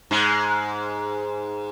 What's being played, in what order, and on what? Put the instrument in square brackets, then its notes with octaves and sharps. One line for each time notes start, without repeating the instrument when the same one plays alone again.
[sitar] G#2 G#3